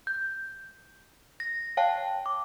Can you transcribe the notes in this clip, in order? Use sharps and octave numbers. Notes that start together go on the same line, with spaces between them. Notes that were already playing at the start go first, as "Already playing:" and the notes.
G6
A#6
C#5 F5 G5 A5
D6